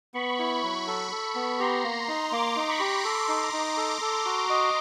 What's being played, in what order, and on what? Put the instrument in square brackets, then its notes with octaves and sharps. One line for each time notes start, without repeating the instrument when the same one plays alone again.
[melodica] B3 [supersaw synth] B5 C#6
[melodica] E4
F#3
A4
A4
B3
[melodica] G4 [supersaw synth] A#5 C6
[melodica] A#3
D#4
[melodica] A#3 [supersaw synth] C6 D6
[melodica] D#4
[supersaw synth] B5 C#6
[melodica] G4
[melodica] A4 [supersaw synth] C6 D6
[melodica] D#4
[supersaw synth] A#5 C6
[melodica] D#4
A4
A4
F#4
D#5